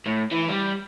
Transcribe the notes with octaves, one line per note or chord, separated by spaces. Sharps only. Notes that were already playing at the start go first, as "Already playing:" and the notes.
A2
E3
G3